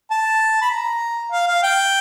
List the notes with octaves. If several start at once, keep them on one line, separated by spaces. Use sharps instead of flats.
A5
B5
A#5
F5
F5
G5